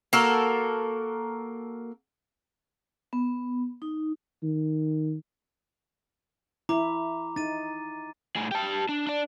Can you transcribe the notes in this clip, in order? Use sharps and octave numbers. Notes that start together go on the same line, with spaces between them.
A#3 F#4 A4 A#4
B3
D#4
D#3
E4 A#5 D6
D#4 A6 D#7
A2 G#4
G4 A5
D4
D4 D5